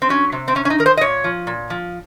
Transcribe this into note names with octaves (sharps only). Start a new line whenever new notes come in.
C4
F#3 C#4
C3
C4
C3 C#4
C#4
D#4
D#3 A#4
C5
D#5
A#2 C#5
F3
A#2
F3